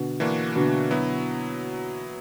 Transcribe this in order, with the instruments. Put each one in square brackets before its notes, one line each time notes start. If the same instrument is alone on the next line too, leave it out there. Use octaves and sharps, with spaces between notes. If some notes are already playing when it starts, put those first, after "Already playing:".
Already playing: [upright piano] B2 D3
[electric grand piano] E3 A#3 D4 F#4
[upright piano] B2 D3
[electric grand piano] F#3 B3 E4